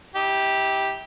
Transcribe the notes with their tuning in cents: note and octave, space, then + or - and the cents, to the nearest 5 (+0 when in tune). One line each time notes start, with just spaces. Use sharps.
E4 -40 G4 +0